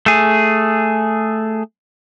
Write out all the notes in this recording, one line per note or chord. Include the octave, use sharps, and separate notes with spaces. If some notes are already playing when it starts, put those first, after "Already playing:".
A3 G#4